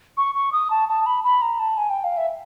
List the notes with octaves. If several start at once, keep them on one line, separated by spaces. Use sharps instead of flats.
C#6
C#6
D#6
A5
A5
B5
B5
A#5
A5
G#5
G5
F5
E5